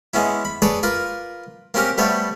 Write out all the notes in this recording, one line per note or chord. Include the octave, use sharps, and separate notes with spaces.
G#3 B3 C#4 E4
B5
G#4 A4 B4 C#5 D5
F4 A#4 B4 D6
A#3 C4 C#4 G4 A#4
G3 A3 B3 C5 C#5